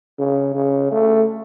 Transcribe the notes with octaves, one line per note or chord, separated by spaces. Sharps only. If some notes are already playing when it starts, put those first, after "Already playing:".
C#3
C#3
A3